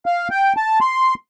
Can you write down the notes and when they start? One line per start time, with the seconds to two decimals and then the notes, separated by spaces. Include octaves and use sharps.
0.06 F5
0.31 G5
0.57 A5
0.81 C6